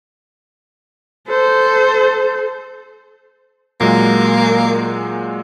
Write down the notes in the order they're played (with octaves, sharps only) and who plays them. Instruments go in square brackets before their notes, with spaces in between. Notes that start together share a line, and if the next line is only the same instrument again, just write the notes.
[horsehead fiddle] A4 C5
[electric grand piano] A#2 F#3 G#3 [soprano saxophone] A#3